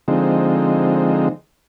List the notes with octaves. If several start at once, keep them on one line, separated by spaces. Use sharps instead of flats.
D3 F3 G#3 C4 D#4